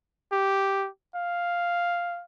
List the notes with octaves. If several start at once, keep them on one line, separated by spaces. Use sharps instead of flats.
G4
F5